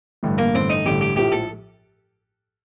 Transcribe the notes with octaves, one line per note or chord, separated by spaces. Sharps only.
A1 G2 D3 A3
A#3
A1 G2 D3 A3 C4
D#4
A1 G2 D3 A3 G4
G4
A#1 A2 F3 G4
A4